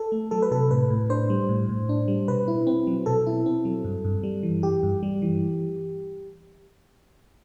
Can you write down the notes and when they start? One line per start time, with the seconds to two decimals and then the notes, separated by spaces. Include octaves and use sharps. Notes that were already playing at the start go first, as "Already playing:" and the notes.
Already playing: A4
0.12 A3
0.31 F#3 A4
0.42 B4
0.51 C3 A4
0.71 A2 B4
0.90 A2
1.10 D4 C5
1.30 G3
1.49 A2
1.69 A2
1.89 D4
2.08 G3
2.28 B2 B4
2.48 E4
2.67 C4
2.87 F#3
3.06 B2 A4
3.27 E4
3.46 C4
3.65 F#3
3.84 G2
4.04 G2
4.23 G3
4.43 E3
4.63 G2 G4
4.83 G2
5.03 G3
5.22 E3